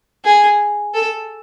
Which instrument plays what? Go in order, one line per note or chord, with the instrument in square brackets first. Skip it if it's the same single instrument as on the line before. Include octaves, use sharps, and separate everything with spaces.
[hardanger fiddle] G#4
A4